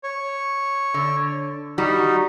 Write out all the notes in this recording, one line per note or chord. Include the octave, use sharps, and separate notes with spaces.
C#5
D3
G3 D#4 F#4